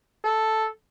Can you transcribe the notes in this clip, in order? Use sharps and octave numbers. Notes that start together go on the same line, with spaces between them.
A4